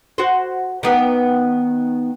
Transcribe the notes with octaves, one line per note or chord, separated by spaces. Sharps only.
F#4 C5
D#3 B3 G4